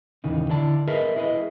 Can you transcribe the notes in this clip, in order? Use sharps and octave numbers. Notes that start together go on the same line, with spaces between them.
D#2 C#3 E3 D#4
D3 E4 D5 A5
G#4 A#4 B4 D#5 E5
E4 G#4 B4 D5 D#5